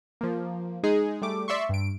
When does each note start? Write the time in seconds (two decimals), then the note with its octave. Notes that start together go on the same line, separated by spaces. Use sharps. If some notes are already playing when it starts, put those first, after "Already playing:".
0.21 F3 A#3
0.83 G#3 D#4 G#4
1.22 G3 A3 D6
1.48 D5 E5 C6 C#6
1.69 G2 D7